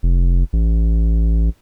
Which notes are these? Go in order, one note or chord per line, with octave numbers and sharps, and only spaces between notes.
F1
A1